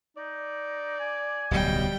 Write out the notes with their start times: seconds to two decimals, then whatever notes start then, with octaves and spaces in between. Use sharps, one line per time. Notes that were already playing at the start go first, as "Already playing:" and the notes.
0.17 D#4 D5
1.00 G#5
1.51 D1 B1 F#3 G3 D#5 G5